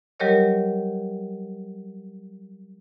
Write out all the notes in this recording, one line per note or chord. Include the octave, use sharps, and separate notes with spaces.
F#3 G3 G4 A#4 C#5 D#5